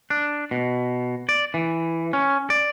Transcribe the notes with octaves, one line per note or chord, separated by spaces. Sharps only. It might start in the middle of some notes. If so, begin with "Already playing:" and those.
D4
B2
D5
E3
C#4
D5